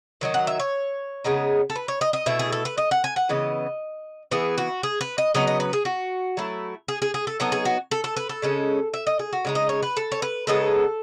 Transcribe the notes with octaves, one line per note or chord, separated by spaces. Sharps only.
D#3 F#3 D#4
F#5
E5
C#5
C#3 G#3 B3 D#4
A4
B4
C#5
D#5
D#5
B2 A3 E4 E5
G#4
A4
B4
D#5
F#5
G#5
F#5
C#3 E3 B3 D#5
E3 B3 E4 G#4
F#4
G#4
B4
D#5
C#3 F#3 B3 D#5
D#5
B4
G#4
F#4
F#3 A3 E4
G#4
G#4
G#4
A4
F#3 B3 D#4 A4
G#4
F#4
A4
A4
B4
A4
C#3 G#3 C#4
E5
D#5
G#4
F#4
C#3 G#3 D#4
D#5
C#5
B4
A4
C#5
B4
C#3 G#3 B3 D#4 A4